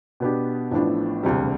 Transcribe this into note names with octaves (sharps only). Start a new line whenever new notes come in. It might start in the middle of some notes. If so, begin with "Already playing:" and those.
B2 B3 D4 G4
A1 A2 F3 B3 D4
E1 D2 C3 G3